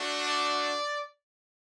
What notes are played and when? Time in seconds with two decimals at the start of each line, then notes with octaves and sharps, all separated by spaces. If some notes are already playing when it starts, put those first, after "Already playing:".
Already playing: A3 D4 F#4
0.25 D5